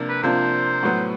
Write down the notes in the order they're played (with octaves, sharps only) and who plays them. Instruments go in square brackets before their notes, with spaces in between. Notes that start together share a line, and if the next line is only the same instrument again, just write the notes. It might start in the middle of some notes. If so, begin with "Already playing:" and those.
Already playing: [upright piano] C3 F3 A#3 D4 F4
[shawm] B4
[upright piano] C3 F3 A#3 D4 F4 [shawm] C5
[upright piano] A2 F#3 B3